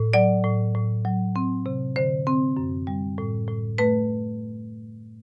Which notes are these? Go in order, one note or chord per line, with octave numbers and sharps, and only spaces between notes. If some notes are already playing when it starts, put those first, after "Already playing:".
Already playing: A2
F#3 D5
A2
A2
F#3
C4
C3
D3 C5
C4
F#2
G3
A2
A2
A3 B4